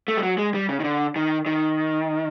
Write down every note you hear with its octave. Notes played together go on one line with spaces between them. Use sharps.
A3
G3
F#3
G#3
G3
C#3
D#3
D3
D#3
D#3